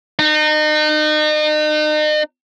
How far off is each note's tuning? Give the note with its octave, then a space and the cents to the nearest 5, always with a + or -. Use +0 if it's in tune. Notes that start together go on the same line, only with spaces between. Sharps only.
D#4 -35